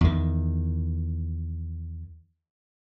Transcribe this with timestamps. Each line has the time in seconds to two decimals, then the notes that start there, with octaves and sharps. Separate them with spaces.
0.01 E2 D#3